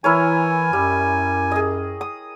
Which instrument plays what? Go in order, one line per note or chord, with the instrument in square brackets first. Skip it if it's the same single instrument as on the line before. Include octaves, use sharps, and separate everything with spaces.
[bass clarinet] E3 [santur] E4 A#4 C#5 [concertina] G#5
[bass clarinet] F#2 [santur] G3
[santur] G#4 D#5
D#6